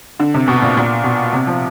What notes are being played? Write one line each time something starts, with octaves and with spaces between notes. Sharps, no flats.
D3
C3
B2
A#2
A#2
B2
C3
F3